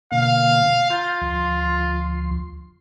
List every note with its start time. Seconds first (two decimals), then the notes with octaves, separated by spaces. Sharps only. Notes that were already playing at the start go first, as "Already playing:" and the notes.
0.12 B2 D3 A#3 F5
0.91 F4 A#5 G6 A6
1.21 D2 F3 C6